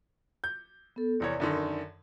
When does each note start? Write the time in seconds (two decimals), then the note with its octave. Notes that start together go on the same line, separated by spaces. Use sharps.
0.44 G6
0.96 B3 A4
1.20 F1 E2 C#5 D5
1.40 F#2 D3 D#3